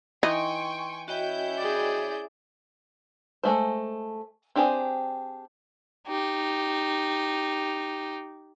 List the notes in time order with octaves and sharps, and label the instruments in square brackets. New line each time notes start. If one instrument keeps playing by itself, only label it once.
[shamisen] E3 D#4 [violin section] G5 G#5 C#6 [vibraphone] C6
[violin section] C#4 E4 G6 [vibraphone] F#4 D#5 G5
[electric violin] G#4 D5
[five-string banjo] G#3 A3 C5
C4 D4 G4 G#4 C5
[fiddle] D#4 G4